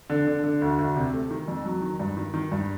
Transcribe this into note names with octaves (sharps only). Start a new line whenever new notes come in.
D3
D3
D3
D2
D2
C3
A3
D#3
F2
F#3
D#3
G2
D#3
D#3
G2